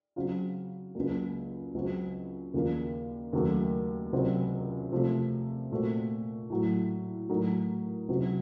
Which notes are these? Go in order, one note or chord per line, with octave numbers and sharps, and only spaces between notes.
C#3 F#3 C4 F4
C#2 C#3 F#3 A#3
C#2 C#3 F#3 C4 F#4
D#2 C#3 F3 A#3 F4
D#2 C#3 F#3 A3
C#2 C3 F#3 C4
C3 F3 A3
A#2 A3 C4 F#4
A2 F#3 A3
A2 F#3 A3 D#4 A#4
C#2 C3 F#3